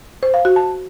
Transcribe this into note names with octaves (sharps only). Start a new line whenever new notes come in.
C5
F5
F#4
A5